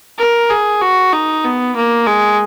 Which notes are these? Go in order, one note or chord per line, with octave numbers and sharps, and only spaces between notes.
A#4
G#4
F#4
D#4
B3
A#3
G#3